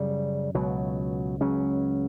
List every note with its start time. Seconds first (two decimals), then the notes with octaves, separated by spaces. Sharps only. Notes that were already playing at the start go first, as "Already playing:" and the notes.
Already playing: F#2 C#3 G3
0.55 C#2 B2 F#3
1.41 C#2 C#3 F#3 C#4